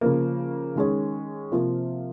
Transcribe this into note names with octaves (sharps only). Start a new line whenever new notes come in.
C#3 F3 A#3
D#3 G#3 C#4 G#4
C3 F3 A#3 F4